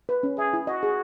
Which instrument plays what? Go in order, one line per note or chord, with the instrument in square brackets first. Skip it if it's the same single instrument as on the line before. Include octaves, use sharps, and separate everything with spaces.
[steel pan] B4
C#4
[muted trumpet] G#4 [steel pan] E5
[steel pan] E4
[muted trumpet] F#4 [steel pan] D#5
[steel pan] G#4